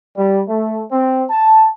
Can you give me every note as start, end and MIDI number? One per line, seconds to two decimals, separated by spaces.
0.17 0.41 55
0.48 0.82 57
0.92 1.24 60
1.30 1.67 81